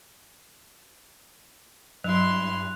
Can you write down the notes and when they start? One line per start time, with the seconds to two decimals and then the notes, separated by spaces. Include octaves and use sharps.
2.04 G2 F#3 E4 C6 F#6 F7